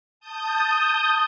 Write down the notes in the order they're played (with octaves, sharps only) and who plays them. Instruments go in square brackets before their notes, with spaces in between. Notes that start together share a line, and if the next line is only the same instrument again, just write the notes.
[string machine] A5 D#6 G6